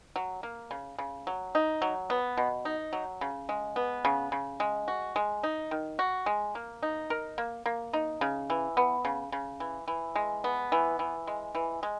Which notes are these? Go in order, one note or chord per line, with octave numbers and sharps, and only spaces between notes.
F#3
A#3
C#3
C#3
F#3
D#4
F#3
B3
B2
D#4
F#3
C#3
G#3
B3
C#3
C#3
G#3
F#4
G#3
D#4
D#3
F#4
G#3
A#3
D#4
A#4
A#3
A#3
D#4
C#3
E3
B3
C#3
C#3
E3
E3
G#3
B3
E3
E3
G#3
E3
G#3